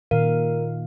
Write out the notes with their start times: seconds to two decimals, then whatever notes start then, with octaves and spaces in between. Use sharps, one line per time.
0.11 A#2 D#3 A#4 F5